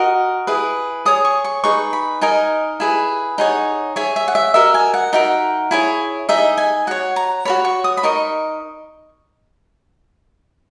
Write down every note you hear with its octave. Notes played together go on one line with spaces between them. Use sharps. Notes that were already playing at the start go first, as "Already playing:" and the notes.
Already playing: F#4 A#4 D#5
E4 G#4 B4
G#4 C#5 D#6
C#6
C#6
D#4 G#4 B4 C#6
B5
D#4 A#4 D#5 G#5
E4 G#4 B4
D#4 G#4 C#5 F#5
G#4 C#5 E5
E5
F#5
E5
F#4 A#4 D#5 E5
G#5
F#5
D#4 F#4 A#4 E5
E4 G#4 C#5
D#4 G#4 D#5 E5
G#5
F#4 C#5 F#5
A#5
F#4 A#4 C#5 B5
C#6
D#6
B5
D#4 A#4 D#5 C#6